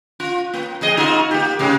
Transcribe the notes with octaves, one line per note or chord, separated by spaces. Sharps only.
F4
A#3
F2 G#4 D#5
D#4 F4 F#4
A#3 G4
G#2 C#3 G#3